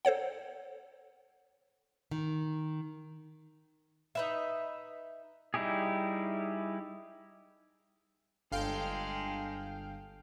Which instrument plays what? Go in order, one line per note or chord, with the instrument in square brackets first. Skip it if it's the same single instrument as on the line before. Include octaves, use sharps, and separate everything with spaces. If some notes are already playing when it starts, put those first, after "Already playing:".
[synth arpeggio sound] A4 C5 C#5 F#5
[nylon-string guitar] D#3
[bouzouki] D#4 B4 E5
[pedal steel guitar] G3 D#4 E4 G4 G#4
[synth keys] G1 F5 G5 [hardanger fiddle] G#3 A4